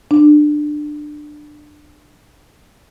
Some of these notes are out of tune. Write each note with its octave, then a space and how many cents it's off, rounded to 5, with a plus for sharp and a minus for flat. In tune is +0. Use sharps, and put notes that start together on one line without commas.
D4 +20